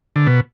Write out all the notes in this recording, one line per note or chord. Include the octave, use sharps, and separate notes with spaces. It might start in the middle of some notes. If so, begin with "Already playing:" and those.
D3
B2